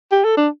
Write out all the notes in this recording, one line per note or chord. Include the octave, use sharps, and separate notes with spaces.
G4
A4
D4